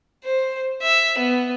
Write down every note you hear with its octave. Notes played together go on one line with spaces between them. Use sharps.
C5
E5
B3